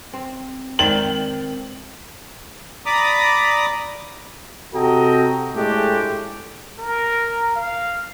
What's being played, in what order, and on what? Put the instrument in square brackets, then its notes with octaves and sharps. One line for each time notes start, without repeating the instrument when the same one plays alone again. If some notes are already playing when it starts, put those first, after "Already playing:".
[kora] C4
[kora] D#3 C4 [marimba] G#3 D5 A6 [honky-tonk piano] F#7
[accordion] D5 A#5 B5 D6 D#6
[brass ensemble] C3 F#4 A4 D#5 G5 A#5
A2 G#3 A3 D4 G4
[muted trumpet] A#4
F5